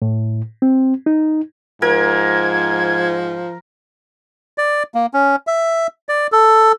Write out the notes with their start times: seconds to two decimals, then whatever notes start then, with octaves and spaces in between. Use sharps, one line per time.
0.02 A2
0.62 C4
1.06 D#4
1.82 G#2 F3 A#4 G#6
4.58 D5
4.94 A#3
5.14 C#4
5.47 E5
6.09 D5
6.32 A4